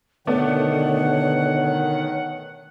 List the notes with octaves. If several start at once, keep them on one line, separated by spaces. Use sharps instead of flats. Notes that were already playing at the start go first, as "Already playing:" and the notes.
B2 D3 D#3 A3 B3 C#5 D5 F#5